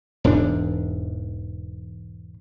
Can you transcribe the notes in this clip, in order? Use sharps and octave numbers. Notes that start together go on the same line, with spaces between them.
E1 E2 G#2 D4